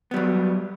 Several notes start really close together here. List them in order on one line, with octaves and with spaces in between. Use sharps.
B3 G3 F#3